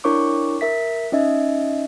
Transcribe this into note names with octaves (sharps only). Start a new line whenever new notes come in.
D4 E4 A#4 C#5 C#6 D6
A#4 E5 B6
C#4 D#4 D#5 E5